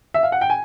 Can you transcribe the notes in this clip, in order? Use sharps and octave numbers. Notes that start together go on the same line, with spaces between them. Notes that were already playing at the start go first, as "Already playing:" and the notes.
E5
F5
F#5
G5
G#5